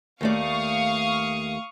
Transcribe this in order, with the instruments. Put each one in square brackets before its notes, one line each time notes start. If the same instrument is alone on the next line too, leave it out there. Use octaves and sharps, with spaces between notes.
[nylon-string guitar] D#2 A3 D5 [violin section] F5 C#6 D#6